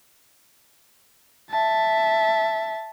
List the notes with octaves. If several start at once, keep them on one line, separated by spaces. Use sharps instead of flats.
E5 A5